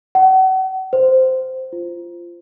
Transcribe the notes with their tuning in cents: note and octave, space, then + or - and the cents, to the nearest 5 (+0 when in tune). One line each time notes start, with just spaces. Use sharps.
F#5 +35
C5 -10
F4 -15